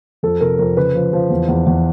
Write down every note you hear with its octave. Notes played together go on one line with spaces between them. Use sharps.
F2 A4
C3 A#4
F2 A#4
C#3 B4
F3
F3
E2
E2
E2